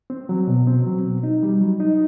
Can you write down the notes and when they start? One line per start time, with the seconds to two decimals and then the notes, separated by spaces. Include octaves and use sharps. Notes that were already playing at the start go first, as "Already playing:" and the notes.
0.10 C4
0.29 F#3
0.48 B2
0.67 C4
0.87 F#3
1.04 B2
1.23 D#4
1.43 G3
1.61 F#3
1.80 D#4